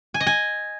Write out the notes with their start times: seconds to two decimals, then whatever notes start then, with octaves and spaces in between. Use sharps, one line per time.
0.14 G#5
0.20 D#5
0.27 G#5